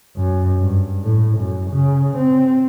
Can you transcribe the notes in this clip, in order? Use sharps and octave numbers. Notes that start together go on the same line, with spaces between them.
F#2
G2
A2
F#2
C#3
C4